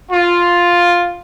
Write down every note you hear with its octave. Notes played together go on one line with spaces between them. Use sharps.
F4